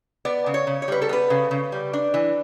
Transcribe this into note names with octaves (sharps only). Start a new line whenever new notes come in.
B3 D5
C#3
C#5
C#3
C#5
G3 B4
A4
B3 B4
C#3
C#3
G3
D4
E3